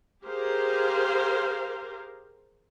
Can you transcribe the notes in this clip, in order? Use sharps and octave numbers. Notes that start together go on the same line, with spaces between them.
G4 G#4 A#4 C5 F5